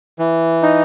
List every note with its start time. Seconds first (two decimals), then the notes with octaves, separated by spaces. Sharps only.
0.19 E3
0.62 D#4